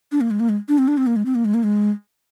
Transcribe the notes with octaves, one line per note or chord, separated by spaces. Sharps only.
D4
A#3
G#3
A#3
G#3
D4
C4
D4
C4
A#3
G#3
C4
A#3
G#3
A#3
G#3